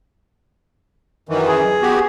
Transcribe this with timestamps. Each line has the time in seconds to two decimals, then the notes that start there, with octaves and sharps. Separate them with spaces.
1.29 F#2 D#3 E3
1.48 G#4
1.82 B3 F#4 G4